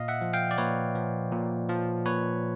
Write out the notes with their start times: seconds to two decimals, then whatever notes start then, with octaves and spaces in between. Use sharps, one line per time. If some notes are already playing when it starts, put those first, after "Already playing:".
Already playing: A#2 D#5 F5
0.08 E5 F#5
0.21 F3
0.33 F5 G5
0.51 D5
0.58 A#2 B4 C#5
0.95 F3
1.32 A#2
1.69 F3
2.06 A#2 B4 C#5